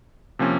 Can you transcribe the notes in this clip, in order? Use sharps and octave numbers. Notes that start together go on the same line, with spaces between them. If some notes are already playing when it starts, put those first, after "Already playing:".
C3 F3 A#3 C#4